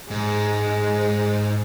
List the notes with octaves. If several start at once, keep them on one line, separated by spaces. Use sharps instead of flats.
G#2 G#3